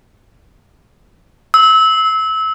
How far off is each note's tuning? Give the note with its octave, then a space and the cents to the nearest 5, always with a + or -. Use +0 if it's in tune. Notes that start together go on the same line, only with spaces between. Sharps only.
E6 -25